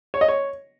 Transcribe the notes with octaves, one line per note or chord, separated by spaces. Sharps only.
C#5
D#5
C#5